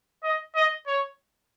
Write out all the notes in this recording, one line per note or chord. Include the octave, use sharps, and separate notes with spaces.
D#5
D#5
C#5